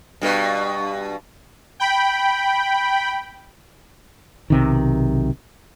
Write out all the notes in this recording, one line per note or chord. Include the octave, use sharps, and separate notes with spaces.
G2 B2 B4
G5 B5
B1 C3 D#3